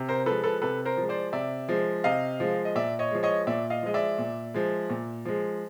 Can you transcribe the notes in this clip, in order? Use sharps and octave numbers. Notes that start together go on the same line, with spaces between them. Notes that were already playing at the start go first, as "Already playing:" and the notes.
Already playing: C3
A#4 C5
F3 G#3 A4 B4
A4 B4
C3 A4 B4
A#4 C5
F3 G#3
C5 D5
C3 D5 E5
F3 G#3
C3 D#5 F5
F3 G#3
D#5
A#2 D5 E5
C#5 D#5
F3 G#3
C#5 D#5
A#2 D5 E5
D#5 F5
F3 G#3 D#5
D5 E5
A#2
F3 G#3
A#2
F3 G#3